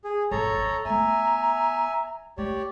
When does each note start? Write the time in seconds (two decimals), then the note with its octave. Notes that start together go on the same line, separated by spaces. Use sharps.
0.04 G#4
0.31 G#1 A4 C#5 A#5
0.53 F2
0.85 A3 B3 E5 G#5 A#5
2.38 A3 G4 C#5 D5